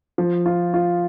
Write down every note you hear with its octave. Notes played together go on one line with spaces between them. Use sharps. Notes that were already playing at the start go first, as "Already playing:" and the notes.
F3
F4
F4